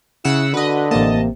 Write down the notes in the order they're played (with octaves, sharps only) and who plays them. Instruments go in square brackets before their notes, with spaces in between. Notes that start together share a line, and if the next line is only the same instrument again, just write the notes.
[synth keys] C#3 F#5 E6 [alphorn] E4
[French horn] D3 [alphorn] F#4 [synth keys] B4 D#5
[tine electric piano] A1 A#3 [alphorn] C3 [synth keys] D#5 A5